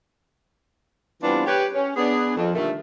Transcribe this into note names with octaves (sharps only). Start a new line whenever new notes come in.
E3 G3 B3 C4 D4 F4
G4 B4 C#5
C#4
B3 D4 G#4
F2
A#2 D3 D#3 G3 A3